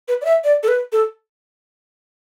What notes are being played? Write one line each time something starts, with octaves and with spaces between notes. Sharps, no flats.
B4
D5
E5
D5
A4
B4
A4